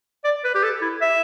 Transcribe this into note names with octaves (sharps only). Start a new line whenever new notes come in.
D5
B4
G4
A4
E4
E5